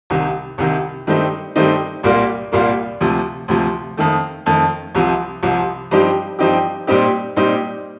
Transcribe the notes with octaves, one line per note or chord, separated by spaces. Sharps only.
C2 C3 D#3
C2 C3 D#3
G2 D#3 A3 C4 D#4
G2 D#3 A3 C4 D#4
C2 A#2 G3 A#3 F4
C2 A#2 G3 A#3 F4
D2 C3 F3
D2 C3 F3
F2 D#3 A3
F2 D#3 A3
C2 C3 F3
C2 C3 F3
G2 F3 C4 D#4 G4
G2 F3 C4 D#4 G4
A#2 G3 C4 D#4 G4
A#2 G3 C4 D#4 G4